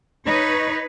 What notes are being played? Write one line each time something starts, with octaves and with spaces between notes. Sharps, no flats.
D#4 B4 C#5